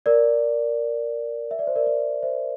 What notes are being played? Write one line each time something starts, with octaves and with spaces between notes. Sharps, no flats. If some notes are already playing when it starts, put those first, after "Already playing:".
A#4 D5
E5
D5
C5
A#4 D5
A#4 D5
C5 E5